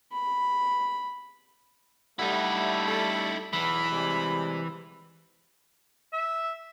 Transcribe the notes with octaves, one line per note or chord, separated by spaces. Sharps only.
B5
G3 A3 D#4 E4 F#5
A4
B1 E2 E3 B5
C3 G3 G#3
E5